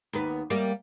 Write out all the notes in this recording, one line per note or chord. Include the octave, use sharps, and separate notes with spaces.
D#2 B3
G3 A#3